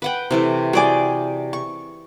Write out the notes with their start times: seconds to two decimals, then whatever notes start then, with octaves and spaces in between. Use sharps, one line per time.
0.02 B4 F#5 G5
0.31 C3 E3 A3
0.73 F#4 G#4 D5 G5 G#5 D6
1.53 C#6